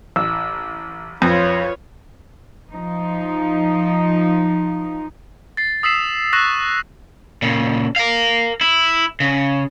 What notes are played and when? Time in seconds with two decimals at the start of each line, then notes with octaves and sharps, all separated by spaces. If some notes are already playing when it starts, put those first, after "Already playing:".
0.16 A1 E6
1.22 F2 F4 B4 C#5 A#6
2.71 F3 D#4
5.57 A6 C7
5.83 D#6 E6 B6 C7 E7
6.33 C#6 E6 F#6 A#6 C7 E7
7.42 A#2 C#3
7.96 A#4 F5
8.61 E4
9.20 C#3